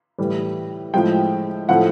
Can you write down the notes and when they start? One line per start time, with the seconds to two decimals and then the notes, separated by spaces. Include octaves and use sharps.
0.18 A2 E3 G3
0.94 A2 F3 G#3 G5
1.69 A2 F3 A3 F#5